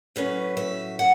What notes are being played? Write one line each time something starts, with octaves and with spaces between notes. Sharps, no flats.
A2 F#3 C#4 B4
E5
F#5